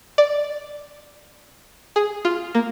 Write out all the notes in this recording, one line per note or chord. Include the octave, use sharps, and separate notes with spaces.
D5
G#4
F4
A#3